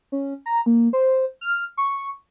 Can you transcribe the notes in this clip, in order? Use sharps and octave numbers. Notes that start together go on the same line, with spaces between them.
C#4
A#5
A#3
C5
F6
C#6